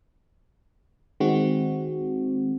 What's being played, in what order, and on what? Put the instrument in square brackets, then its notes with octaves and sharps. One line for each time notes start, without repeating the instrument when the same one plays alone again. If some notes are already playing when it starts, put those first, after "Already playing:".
[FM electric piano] D#3 G#3 C4 F#4